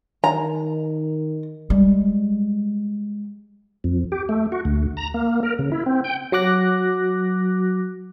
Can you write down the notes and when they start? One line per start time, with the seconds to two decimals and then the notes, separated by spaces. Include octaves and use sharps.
0.24 D#3 A#5
1.70 G3 G#3
3.84 F2
4.12 G4
4.29 A3
4.52 F#4
4.65 D2
4.97 A#5
5.14 A#3
5.43 A#4
5.59 C#3
5.72 E4
5.86 C4
6.04 G5
6.32 F#3 F#4 D6 F#6 A#6